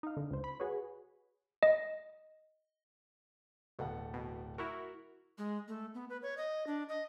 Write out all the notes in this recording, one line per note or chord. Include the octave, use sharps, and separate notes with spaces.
D#4 F5
D3
C#2 C5
B5
F#4 G#4 B4 C#5
D#5
D1 B2 A4 F#5
B2
E4 F#4 A#4 C#6
G#3
A3
B3
B4
C#5
D#5
D4
D#5